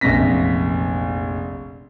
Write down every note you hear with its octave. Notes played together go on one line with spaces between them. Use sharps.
F1 A#1 F#2 C3 A#6 B6